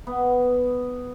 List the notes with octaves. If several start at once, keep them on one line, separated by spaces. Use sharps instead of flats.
B3